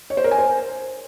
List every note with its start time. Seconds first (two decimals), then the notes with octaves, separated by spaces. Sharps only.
0.10 C#5
0.17 C5
0.24 A#4
0.31 G#5
0.38 C5